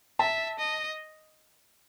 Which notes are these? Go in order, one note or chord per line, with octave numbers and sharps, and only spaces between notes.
E5 A5
D#5